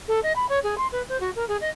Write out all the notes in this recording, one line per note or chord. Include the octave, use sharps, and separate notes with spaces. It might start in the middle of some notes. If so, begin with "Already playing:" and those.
A4
D#5
B5
C#5
G#4
C6
B4
C5
F#4
A#4
G#4
D#5